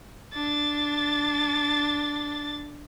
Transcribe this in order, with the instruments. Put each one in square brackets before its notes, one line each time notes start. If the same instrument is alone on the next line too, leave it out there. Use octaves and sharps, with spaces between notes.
[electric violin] D4 A6